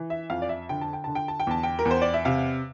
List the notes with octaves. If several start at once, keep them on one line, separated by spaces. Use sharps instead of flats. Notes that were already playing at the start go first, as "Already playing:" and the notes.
Already playing: E3
E5
F2 F5
D5
E5
D3 G5
A5
G5
D3 A5
G5
A5
G5
E2 A5
G5
A#4
E2
C5
D5
E5
C3 F5